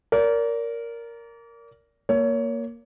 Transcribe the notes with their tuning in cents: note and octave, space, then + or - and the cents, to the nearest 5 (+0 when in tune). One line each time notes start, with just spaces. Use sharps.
A#4 +0 D5 -35
A#3 +0 C#5 +20